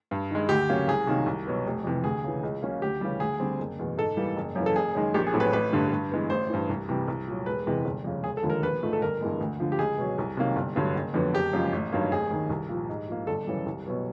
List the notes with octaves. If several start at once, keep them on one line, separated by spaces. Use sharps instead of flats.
G2
D#3 G#3
D2 G4
C#3 F#3 A#3 C#4
C2 G#4
C3 D#3 F#3 A#3
C2
B2 F#3 B3
F1
F2 C3 E3
D2 G#4
C#3 E3
C#2
C#3 F#3 A#3 C#4
D2 G4
C#3 E3 G3
D2 G#4
D3 G3 C4
F#1
E2 B2
G#2 A4
E3 G3 A#3
F#1
F#2 C#3 E3
A4
F#1 G#4
F#2 D#3 G#3
A#1 G4
G#4
A2 F#3 A3 C4
B4
A1 B4
G2 D3 G3
G2
E3 G#3 B3
A1 C5
G2 E3
C2
C3 E3 G3
C2
A#2 F#3
E1 B4
E2 C3 E3 G#3
G1
F2 C#3
E1 G#4
A4
D#2 D3 F3 G#3
A#4
A#1 B4
G#2 F3 A3
A4
G1 A#4
G2 E3 G#3 B3
D2
D3 F3
G4
C#2 G#4
B2 F#3
C2
C3 D#3 F#3 A#3
G1
G2 D3 F#3
F#1
F2 D3 F#3 B3
F#1 G4
F#2 C#3 F3 G#3
A1
G2 D#3 F#3 A#3
F1 G#4
D#2 D#3
C2
A#2 F3
G#2
F3 A#3
G1 A4
F#2 C#3 E3 G3
C2
B2 F#3 B3